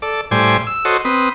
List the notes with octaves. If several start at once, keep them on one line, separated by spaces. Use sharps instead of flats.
A4 D5
A2 G3 C5 D5 G#5
E6
F#4 A4 C5 C#5 D#5
C4 B4 D#6